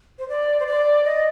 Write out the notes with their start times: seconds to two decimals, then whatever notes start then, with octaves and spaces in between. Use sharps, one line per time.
0.19 C5
0.29 D5
0.60 C5
0.67 D5
1.05 D#5